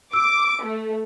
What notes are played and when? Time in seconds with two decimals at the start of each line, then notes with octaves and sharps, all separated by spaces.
0.13 D6 E6 D7
0.64 A3